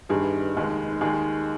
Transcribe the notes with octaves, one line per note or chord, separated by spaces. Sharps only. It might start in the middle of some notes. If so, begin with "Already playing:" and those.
G1 G2 D#3 G3 G#4
F1 D#2 D#3 G#3
D#2 D#3 G#3 G#4